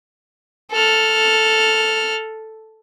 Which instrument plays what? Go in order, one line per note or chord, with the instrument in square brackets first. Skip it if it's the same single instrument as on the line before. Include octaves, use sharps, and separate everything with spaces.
[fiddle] A4 F6